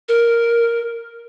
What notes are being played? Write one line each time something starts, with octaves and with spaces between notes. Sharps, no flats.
A#4